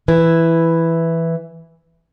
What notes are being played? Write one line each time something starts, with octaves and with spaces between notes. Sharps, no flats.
E3 E4